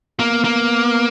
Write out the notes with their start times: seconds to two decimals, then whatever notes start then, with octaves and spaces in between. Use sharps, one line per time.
0.20 A#3 B3
0.44 A#3